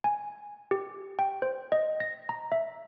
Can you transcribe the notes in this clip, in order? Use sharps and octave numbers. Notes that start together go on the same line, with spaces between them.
G#5
G4
G5
C5
D#5
A#6
A#5
E5